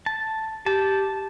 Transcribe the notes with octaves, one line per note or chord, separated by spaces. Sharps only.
A5
G4 A5